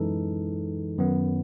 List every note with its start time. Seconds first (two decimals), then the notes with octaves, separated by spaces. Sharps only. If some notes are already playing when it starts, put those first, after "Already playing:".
Already playing: F#2 E3 G#3 D#4 A4
0.98 F#2 D#3 F#3 B3